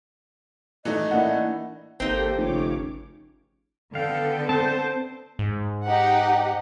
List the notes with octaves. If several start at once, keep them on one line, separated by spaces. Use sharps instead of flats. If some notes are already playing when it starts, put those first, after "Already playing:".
E3 A3 D#4 D#5
A#3 D4 E4 F#5
G#1 A#3 C4 D#4 G4 A4
F1 C#3 C#5 D6
D3 B3 A4 F5 G5
C4 C5 A5 G6
G#2
D#4 G4 F#5